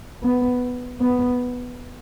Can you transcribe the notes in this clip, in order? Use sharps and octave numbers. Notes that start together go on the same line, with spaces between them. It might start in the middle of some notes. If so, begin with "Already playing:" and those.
B3
B3